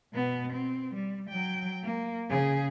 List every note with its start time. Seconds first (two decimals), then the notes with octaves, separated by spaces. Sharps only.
0.13 B2 B3
0.53 C4
0.95 G3
1.30 F#3 G5
1.83 A#3
2.30 C#3 G#4